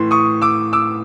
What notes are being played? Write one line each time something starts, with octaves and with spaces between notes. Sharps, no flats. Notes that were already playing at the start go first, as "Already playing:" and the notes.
Already playing: A2 E3 C6
C#6 D#6
D6 E6
D6 E6